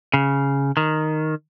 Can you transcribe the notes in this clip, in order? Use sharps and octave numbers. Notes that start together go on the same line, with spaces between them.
C#3
D#3